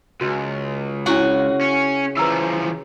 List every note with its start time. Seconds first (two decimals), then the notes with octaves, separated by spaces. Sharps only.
0.21 C#2 F#4
1.06 C#3 D4 E4 F#4 F#5
1.61 C#4
2.17 E3 F3 B4 A#5 E6